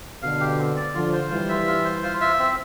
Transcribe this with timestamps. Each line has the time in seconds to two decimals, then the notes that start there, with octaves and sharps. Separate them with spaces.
0.22 B2 D3 F5
0.40 G4
0.59 C4
0.77 D5
0.95 D3 F3 F4
1.13 C5
1.30 E3 G3 F4
1.49 E5
1.67 F4
1.85 C5
2.03 F4
2.21 E5
2.39 C4